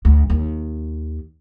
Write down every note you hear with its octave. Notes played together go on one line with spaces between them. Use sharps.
D2
D#2